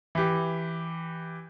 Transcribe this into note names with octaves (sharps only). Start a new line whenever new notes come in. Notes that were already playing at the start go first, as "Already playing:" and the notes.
E3 G4